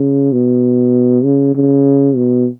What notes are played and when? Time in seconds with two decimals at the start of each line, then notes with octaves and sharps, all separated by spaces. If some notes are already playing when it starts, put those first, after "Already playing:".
Already playing: C#3
0.32 B2
1.24 C#3
1.55 C#3
2.16 B2